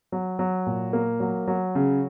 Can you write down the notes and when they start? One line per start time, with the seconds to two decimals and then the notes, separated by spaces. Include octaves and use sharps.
0.12 F#3
0.39 F#3
0.66 A#2
0.93 A#3
1.20 F#3
1.47 F#3
1.75 C#3